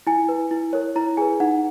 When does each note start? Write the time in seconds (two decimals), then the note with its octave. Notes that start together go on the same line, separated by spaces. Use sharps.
0.07 E4 G#5
0.29 B4
0.51 E4
0.73 A#4 C#5
0.96 E4 A#5
1.17 G#4 B4 G#5
1.40 D#4 F#5